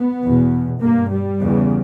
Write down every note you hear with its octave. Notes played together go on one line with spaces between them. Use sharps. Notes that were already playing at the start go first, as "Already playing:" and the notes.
Already playing: B3
E2 B2
G2 A#3
G3
E2 C#3